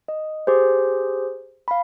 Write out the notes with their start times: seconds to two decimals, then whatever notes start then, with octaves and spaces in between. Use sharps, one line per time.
0.08 D#5
0.47 G4 G#4 C5
1.68 F5 B5